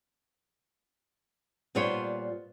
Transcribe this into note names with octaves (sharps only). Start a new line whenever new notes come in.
A#2 G3 B3 F4 C5 C#5